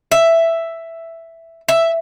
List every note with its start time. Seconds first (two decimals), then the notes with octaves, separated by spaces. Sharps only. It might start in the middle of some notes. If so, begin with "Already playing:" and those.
0.12 E5
1.68 E5